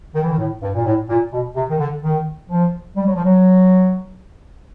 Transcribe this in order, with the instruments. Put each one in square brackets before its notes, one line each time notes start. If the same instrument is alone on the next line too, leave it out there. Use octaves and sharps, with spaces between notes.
[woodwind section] D#3
E3
D#3
A2
G2
A#2
A2
A#2
B2
C3
D#3
D3
D#3
F3
G3
F#3
F3
F#3